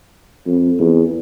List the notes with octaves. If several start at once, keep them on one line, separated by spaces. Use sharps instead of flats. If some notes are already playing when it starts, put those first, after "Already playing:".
F2
E2